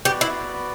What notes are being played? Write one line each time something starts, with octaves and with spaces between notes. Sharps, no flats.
B3 F#4 G4 B4 D5
E4